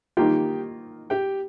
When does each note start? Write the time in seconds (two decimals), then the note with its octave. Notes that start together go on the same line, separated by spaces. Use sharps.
0.17 D#3 A#3 F4 G4 G5
1.10 G4 G5